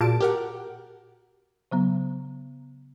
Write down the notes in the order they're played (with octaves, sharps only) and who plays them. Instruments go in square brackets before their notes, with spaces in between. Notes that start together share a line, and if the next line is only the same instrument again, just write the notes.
[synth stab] A#2 A5 D7 [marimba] F#4 G#4
[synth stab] G4 A#4 F#5
[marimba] C#3 F#3 B3